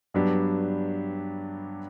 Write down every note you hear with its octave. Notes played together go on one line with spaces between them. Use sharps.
G2 F#3 B3 D4 G4